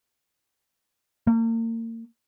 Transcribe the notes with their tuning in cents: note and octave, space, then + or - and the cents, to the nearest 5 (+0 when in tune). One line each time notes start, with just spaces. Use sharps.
A#3 -35